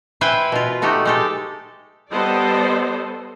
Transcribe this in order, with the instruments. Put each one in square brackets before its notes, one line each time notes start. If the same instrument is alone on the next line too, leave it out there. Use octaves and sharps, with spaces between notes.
[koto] E4 B4 C5 E5 G5 G#5
B2 F4
A3 D#4 F#4 G4
G#3 G4 A4
[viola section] G3 B3 A4 C5 D5 D#5